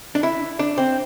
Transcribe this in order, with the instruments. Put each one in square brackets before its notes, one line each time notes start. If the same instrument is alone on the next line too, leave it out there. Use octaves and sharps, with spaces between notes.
[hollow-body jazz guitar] D4
E4
D4
C4